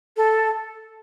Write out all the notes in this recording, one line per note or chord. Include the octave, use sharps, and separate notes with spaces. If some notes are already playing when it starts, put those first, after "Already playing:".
A4